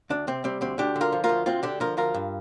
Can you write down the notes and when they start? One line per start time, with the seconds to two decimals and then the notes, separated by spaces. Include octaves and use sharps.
0.10 D2 D4
0.28 C3 C4
0.44 G3 C4
0.61 D2 C4
0.78 D2 D4 G4
0.96 D3
1.01 F4 A#4
1.12 F3
1.24 F4 A#4
1.29 D2
1.46 D2 C4 F4
1.63 D3 D4 G4
1.80 F3 F4 A#4
1.97 D2 F4 A#4
2.14 G2